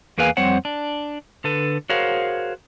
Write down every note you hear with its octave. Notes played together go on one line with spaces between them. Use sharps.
E2 A#3 G#4 B4 F5 G#5
F2 G3 C4 C5 C#5 F#5
D4
D3 A4 B4
F#4 G#4 A#4 C5 C#5 F5